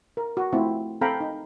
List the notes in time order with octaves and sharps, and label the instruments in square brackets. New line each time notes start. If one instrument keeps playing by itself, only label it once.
[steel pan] A#4
F#4
A3 C4 E4 F4
C4 A4 F5 G5 A#5 B5
D#4